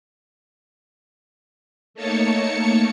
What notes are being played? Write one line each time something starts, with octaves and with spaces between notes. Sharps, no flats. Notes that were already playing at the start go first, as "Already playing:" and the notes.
A3 A#3 D#4 C#5 A5 C#7